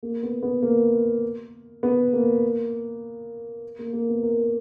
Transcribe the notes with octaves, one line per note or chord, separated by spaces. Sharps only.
A#3
B3
B3
A#3
B3
A#3
A#3
A#3
B3
A#4